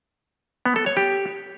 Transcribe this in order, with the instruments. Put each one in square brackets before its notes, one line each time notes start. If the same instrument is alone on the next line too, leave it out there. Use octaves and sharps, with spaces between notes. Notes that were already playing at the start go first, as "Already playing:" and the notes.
[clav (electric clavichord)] B3
A4
C#5
G4